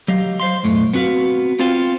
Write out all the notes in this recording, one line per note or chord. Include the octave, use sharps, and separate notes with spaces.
F#3 G4 D#5 F5
C5 F5 C6
B1 F#2 A2 A3
B3 C4 F#4 B4 F5
B3 C4 F4 C5 F5 G5